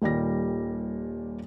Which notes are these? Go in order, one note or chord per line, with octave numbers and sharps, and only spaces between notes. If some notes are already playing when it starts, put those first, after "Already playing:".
D#1 A#2 D#3 G3 D5 A#6